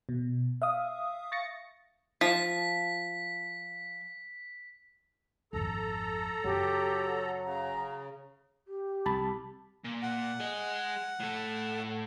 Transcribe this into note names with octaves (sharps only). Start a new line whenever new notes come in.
B2
E5 F5 D#6
C#6 A6 A#6 C#7
F3 B6
G#1 F2 A4 A#5
F#1 F#3 G4
C#3 A#5
G4
C2 A5 B5
A#2
F#5
G#4 D#5
A2 A4